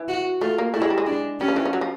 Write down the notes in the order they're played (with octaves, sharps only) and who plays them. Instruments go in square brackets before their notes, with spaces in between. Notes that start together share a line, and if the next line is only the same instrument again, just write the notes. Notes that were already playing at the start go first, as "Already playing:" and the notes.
Already playing: [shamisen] E3
[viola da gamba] F#4
[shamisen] A3 [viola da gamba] F4
[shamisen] A#3
[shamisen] A3 [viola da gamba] E4
[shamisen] G#3
G3
G#3
[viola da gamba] D4
[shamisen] G3 [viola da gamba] C#4
[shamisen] F3
E3
F3
F#3
F3